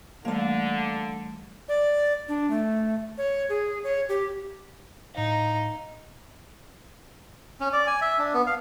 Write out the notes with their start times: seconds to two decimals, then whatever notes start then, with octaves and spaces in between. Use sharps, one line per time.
0.25 D3 E3 G3 A3 A#3 F5
1.69 D5
2.28 D4
2.51 A3
3.18 C#5
3.49 G#4
3.84 C#5
4.09 G4
5.15 A2 D#4 F5
7.60 C#4
7.73 D5
7.87 G#5
8.02 E5
8.19 D4
8.34 B3
8.47 F5